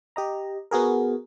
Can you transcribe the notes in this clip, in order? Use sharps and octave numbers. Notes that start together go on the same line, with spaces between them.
G4 D#5 A#5
B3 F#4 G#4 A#4